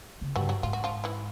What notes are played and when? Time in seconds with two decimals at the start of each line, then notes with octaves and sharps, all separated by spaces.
0.22 C#3
0.36 G2 F#3 F#4
0.49 F#3 F#4
0.63 G#2 F4
0.73 F#4
0.84 F3 F4
1.04 E3 E4